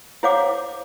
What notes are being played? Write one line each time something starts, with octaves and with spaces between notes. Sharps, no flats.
E4 C5 C#5 F5 F#5 D6